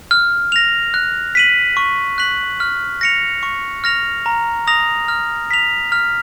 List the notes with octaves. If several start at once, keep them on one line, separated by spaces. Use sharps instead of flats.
F6
A#6 F7
F#6
B6 D#7 F#7
C#6
F#6 B6 F#7
F6
A#6 C#7 F7
C#6
F6 A#6 F7
A#5
D#6 A#6 F7
F6
B6 F7
F6